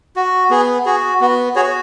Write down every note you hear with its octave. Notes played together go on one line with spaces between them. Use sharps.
F#4
B3 G#4
F#4 G#4
B3 F#4
F#4 G#4 C#5